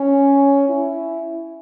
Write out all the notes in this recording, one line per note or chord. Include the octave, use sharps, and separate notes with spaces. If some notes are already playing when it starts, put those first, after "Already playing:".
Already playing: C#4
E4